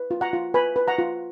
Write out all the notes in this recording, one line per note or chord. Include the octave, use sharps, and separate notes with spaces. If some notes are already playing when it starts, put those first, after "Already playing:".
Already playing: B4
F4
F#5 A#5
F4
B4 G#5 B5
B4
F#5 A#5
F4